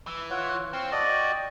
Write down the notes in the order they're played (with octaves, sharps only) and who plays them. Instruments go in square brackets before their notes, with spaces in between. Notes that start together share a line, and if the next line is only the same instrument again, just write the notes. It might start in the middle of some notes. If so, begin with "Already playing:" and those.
[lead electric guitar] E3
[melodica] F4 C#5 F#5
[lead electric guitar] C4 [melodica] F5 C#6
[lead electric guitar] F#4 [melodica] A4 [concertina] D5 D#5
[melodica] G5